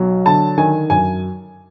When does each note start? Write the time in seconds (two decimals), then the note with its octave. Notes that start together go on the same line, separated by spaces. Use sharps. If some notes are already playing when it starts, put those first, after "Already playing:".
Already playing: B1 F#3
0.25 D3 A5
0.58 D#3 G#5
0.90 F#2 G#5